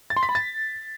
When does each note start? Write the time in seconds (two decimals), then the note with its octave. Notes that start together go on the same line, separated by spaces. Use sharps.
0.10 A6
0.17 C6
0.23 B6
0.29 B5
0.35 A6